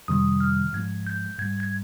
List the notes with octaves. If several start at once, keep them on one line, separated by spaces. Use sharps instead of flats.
F2 C3 D#3 G3 D#6
F6
G#2 F3 G#3 G#6
G6
G#2 G3 G#6
G#6